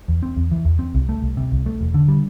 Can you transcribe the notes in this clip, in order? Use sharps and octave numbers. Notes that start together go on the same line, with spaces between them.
E2
C4
E2
E3
E2
C4
C2
A3
C2
C3
C2
A3
E1
D3
G3